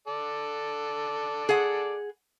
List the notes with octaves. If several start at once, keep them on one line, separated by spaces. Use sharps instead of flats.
A4 D5
G#4 F#5